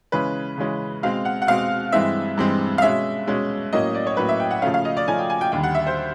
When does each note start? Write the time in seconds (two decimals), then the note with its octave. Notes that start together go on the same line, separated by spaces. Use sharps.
0.12 C#3 E3 G#3 C#4 B4
0.58 C#3 E3 G#3 C#4
1.03 B2 G#3 C4 F5
1.25 F#5
1.42 F#5
1.47 B2 G#3 C4 F5
1.92 G2 E3 G#3 C4 E5
2.37 G2 E3 G#3 C4
2.78 F5
2.82 B2 G#3 C#4 E5
3.27 B2 G#3 C#4
3.73 A2 F#3 A#3 C#4 D#5
3.95 D5
4.07 C#5
4.17 A2 F#3 A#3 C#4 B4
4.29 E5
4.40 G5
4.51 F#5
4.62 C#3 F3 A3 C#4 F5
4.74 F5
4.85 D#5
4.97 D5
5.07 C#3 F3 A3 C#4 G#5
5.19 G5
5.30 G#5
5.41 G5
5.52 D#2 D3 G3 G5
5.63 F#5
5.75 E5
5.87 C5